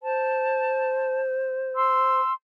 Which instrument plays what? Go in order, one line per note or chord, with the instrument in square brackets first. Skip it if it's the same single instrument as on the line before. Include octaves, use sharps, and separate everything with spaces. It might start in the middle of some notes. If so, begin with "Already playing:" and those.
[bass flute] C5 [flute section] A5
[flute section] C6 E6